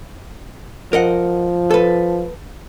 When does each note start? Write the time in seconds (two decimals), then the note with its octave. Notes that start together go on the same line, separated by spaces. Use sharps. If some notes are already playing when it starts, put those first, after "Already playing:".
0.93 F3 A#4 D#5 F#5
1.71 A4 B4